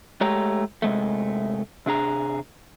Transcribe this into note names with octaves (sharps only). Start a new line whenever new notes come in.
G#3 A3 G4 C#5 A#5
C3 G#3 A3
C3 D4 G#4 A#5